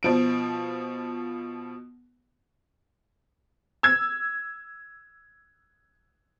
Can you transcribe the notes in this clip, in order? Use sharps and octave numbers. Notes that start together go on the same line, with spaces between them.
B2 F3 D7
E6 G#6